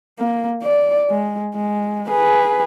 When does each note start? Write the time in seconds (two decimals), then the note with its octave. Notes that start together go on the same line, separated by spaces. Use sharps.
0.19 A#3
0.63 D5
1.10 G#3
1.55 G#3
2.09 G#4 B4